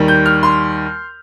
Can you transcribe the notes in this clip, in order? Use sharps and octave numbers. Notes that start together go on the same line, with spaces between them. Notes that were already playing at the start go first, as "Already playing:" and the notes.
Already playing: D#2 D#3 G3
G6
F6
C6